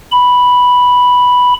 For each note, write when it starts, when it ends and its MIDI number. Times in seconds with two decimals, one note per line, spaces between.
0.12 1.54 83